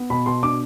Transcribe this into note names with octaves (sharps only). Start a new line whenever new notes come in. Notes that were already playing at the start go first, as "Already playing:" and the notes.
Already playing: B3
B2 B5
B2 C6
D4 D6